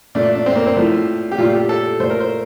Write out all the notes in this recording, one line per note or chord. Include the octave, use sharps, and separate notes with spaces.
A#2 A3 D4
D4
D4
C4
A#3
C4
A2 F3 A3
G4
A#2 A3 F4
G4
A4
A#2 A3 C5
A#4
C5